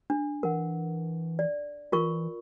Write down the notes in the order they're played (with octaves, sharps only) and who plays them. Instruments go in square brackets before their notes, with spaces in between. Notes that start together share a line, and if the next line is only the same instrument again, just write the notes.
[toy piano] D4
[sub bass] E3 [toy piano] A#4 F#5
[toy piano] D5
[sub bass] E3 [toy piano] F4 A#4 C#6